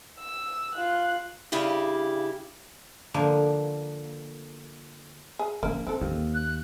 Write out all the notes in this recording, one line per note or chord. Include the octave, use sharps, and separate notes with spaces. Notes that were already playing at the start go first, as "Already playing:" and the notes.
E6
F4 F#6
G2 C#3 E4 G4
D3 F3 A#3
G#4
F3 A#3 C#4
C4 D#4 A4
D#2 A#3 C#4
F#6